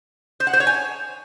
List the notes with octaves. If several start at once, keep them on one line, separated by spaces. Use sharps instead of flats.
C5
F#5
C5
C#5
G#5